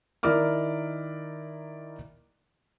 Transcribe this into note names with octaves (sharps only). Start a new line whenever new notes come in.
D#3 E4 A#4 D5 D6 F6